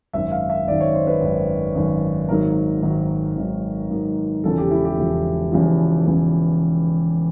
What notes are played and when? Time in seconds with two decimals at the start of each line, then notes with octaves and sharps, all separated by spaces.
0.13 G#1 F#2 D#3 E5
0.32 F5
0.50 E5
0.67 G#1 F#2 D#3 D5
0.80 C#5
0.94 C5
1.07 B4
1.21 G#1 F#2 D#3
1.75 G#1 F#2 D#3
2.29 G#1 G#2 D#3 F#3 A#4
2.83 G#1 G#2 D#3 F#3
3.37 G#1 G#2 D#3 F#3
3.90 G#1 G#2 D#3 F#3
4.44 E1 E2 C#3 F3 A4
4.58 G4
4.71 E4
4.85 G4
4.98 E1 E2 C#3 F3
5.51 E1 E2 C#3 F3
6.05 E1 E2 C#3 F3